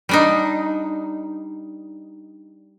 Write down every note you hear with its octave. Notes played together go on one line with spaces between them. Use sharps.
G3 D4 D#4